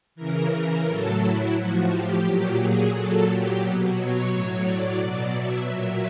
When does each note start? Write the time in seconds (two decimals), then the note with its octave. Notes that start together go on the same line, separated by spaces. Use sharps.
0.15 C#3 E3 A#4
0.85 A2 F#3 A4
1.19 E4
1.53 A2 F3 F#4
1.88 G4
2.23 A#2 F#3
2.57 G#4
2.91 A#2 F#3 A4
3.26 G4
3.60 B2 F#3
3.95 C#5
4.29 A2 F#3
4.64 D5
4.99 B2 F#3
5.33 E5
5.68 A#2 F#3